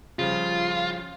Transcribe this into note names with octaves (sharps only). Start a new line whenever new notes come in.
C#3 F3 G3 F4